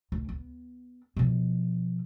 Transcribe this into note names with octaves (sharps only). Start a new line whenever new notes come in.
D2
B3
B2 F3